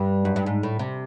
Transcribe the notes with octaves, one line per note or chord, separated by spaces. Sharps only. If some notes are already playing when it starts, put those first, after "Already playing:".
Already playing: G2
F#2
G2
G#2
A2
C3